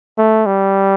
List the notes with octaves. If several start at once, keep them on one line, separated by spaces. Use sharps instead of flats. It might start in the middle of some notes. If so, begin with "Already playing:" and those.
A3
G3